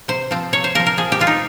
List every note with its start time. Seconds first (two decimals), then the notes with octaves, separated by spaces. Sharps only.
0.08 C3 C5
0.31 F3 C4
0.53 C3 C#5
0.64 C5
0.75 F3 C4 A#4
0.86 A#4
0.97 F3 G#4
1.12 G4
1.19 G#3 C4 F4
1.27 D#4